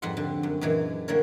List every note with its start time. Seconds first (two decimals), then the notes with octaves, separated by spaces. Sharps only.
0.02 F2 G#2 G3 B4 F#5 C6
0.17 D3
0.43 F#2
0.61 F#2 A#2 E3 G#3
1.08 D3 G3 A#3 E4 A#4 C#5